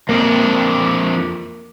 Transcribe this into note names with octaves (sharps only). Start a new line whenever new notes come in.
F2 A#3 D4